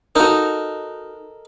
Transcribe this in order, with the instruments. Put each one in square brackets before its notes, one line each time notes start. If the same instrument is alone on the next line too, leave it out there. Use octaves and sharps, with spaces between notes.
[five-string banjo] D#4 F#4 [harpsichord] A4 A#4 D#5